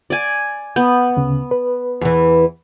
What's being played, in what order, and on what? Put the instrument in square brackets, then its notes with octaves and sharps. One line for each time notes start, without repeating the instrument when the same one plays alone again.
[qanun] D5 G#5
[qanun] B3 [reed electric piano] G6
[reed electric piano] D2 C#3
B4
[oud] E2 E3